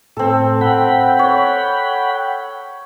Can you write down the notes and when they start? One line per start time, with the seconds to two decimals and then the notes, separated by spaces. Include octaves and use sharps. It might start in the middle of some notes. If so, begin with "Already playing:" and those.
0.17 A2 C4 A4
0.61 F#5 G5 B5
1.19 C#5